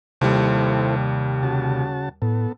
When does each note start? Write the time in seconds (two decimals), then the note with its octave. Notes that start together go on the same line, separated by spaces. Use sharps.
0.21 D#2 C3 G3 E4 A4 C5
1.43 C#3 F#4 A5
2.22 A2 B3 A4